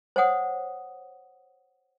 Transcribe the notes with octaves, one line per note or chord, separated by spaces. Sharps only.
C5 C#5 F#5 D#6